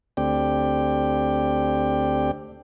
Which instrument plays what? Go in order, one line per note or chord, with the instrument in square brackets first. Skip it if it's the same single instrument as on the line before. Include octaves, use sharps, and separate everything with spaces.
[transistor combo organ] D2 A3 C4 G4 D5 G5